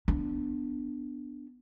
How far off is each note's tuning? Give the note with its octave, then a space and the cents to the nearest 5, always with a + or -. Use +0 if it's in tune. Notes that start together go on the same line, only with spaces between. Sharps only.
B3 +0 D4 +0